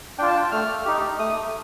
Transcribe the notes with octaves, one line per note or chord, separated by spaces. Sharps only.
D4 F4 G5
A5
G5
A3 F6
D#4 G4
A3 D#6